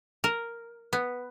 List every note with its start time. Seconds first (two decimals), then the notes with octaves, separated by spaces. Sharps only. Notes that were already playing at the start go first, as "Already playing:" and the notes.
0.24 A#4
0.93 B3